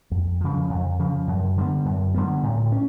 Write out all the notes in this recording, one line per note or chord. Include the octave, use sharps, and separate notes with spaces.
F2
C#3 F3
F2
C#3 F3
F#2
D3 G3 B3
F#2
D3 G3 B3
A2
C#4